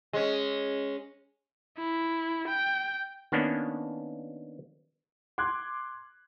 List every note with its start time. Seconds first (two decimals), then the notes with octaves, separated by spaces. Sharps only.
0.13 G#3 C#4
1.78 E4
2.48 G5
3.32 D#3 A#3 B3 C#4 D4
5.38 C6 D6 F#6 G#6